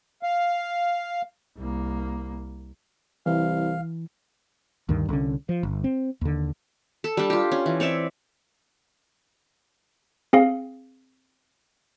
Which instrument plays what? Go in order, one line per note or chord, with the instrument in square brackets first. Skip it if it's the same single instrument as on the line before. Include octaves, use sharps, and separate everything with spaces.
[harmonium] F5
[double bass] C2 A#3
[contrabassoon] C2 [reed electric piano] E3 [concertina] F5
[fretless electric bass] D2 G2 D#3
C2 D3 C#4
F3
G1
C4
D#2 D3
[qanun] A4
G3 D4
F4 G4
C#4
E3
C4 C#5 D5 E5
[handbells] C4 G#4 F5